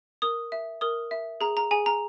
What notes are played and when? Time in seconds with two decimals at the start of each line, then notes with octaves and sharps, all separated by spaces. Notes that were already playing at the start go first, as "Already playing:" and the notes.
0.22 A#4 D#6
0.52 E5
0.81 A#4 D#6
1.11 E5
1.41 G#4 A#5
1.57 A#5
1.71 G#4 G#5
1.86 A#5